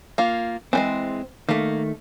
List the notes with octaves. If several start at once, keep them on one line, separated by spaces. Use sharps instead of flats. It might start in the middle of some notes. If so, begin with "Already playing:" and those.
A#3 F4
E3 G3 G#3 C4
D#3 A3 A#3